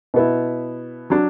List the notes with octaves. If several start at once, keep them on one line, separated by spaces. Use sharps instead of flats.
B2 B3 E4
F#3 D4